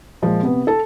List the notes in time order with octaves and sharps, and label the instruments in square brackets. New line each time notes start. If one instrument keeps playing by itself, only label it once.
[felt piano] A#2 F3 G#3
C3 B3
A4 A5